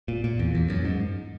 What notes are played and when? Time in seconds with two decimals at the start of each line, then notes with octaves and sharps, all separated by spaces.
0.08 A#2
0.24 A#2
0.39 E2
0.55 E2
0.70 F#2
0.85 G#2